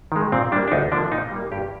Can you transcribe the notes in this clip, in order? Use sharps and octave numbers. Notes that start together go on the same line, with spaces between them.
D#3 G#3
A#2 C4
G3 A#3 D4
D4
D2 D#4
D3 F3 A#3 D4
A#2 D#4
G3 A#3
G2 G4